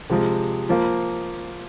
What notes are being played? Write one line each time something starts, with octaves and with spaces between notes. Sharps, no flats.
C3 F3 G#3
F3 A#3